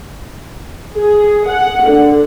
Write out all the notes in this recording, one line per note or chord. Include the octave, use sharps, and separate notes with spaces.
G#4
F#5
D3